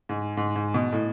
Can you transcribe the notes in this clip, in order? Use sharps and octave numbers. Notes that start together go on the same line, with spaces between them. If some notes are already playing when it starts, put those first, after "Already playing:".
G#2
G#2
G#2
B2
A2